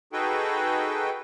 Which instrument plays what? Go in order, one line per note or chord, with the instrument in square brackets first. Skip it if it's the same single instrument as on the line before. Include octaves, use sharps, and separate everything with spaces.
[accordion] D#4 F#4 G#4 A4 B4 G5